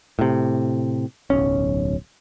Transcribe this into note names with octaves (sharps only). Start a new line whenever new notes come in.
A2 C3
D1 B1 C#4